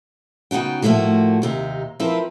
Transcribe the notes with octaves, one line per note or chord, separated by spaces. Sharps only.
C#3 B3 D#4 F#4 G5
A2 F3 A3 A#3 F#4
D#2 C3 D#4
F3 C4 E4 A#4 B4